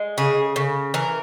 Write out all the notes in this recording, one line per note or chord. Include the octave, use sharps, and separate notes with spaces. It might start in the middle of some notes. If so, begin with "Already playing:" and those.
Already playing: G#3
C#3 G#4
C#3
E3 A#4